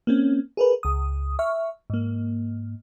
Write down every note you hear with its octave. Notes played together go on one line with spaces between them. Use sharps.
A#3 C4 C#4
G#4 A#4 B4
C#2 D#6
E5 C#6 F6
G#2 A#3